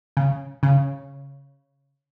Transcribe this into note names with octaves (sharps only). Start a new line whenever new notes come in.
C#3
C#3